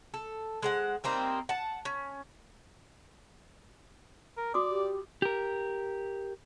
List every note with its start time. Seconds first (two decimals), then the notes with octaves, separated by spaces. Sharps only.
0.14 A4
0.63 G#3 C5 F#5
1.04 G3 A#3 C4 D#4
1.49 F#5 A5
1.85 C#4
4.38 A#4
4.54 F#4 D5 D6 D#6
4.70 G4
5.22 G4 A#4